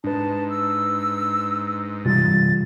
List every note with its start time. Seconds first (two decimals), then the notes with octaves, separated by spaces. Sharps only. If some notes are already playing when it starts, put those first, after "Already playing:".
0.04 G#2 D4 B4 A5
0.49 E6
2.05 C3 E3 G3 F4 A6